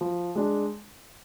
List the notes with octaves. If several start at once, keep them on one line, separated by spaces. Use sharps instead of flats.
F3
G#3 D4